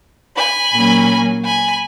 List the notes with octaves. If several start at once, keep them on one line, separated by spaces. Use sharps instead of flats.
G#5 B5
A#2 F#3 A#3 C#4
G#5 B5